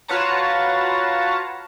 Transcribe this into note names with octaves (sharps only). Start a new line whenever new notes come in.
F4 F#4 B4 C#5 A5 A#5